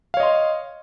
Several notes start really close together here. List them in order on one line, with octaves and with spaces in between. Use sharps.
F5 C#5 D#5 C6